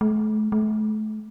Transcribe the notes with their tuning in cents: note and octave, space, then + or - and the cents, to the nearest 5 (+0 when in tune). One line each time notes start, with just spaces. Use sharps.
A3 -40
A3 -35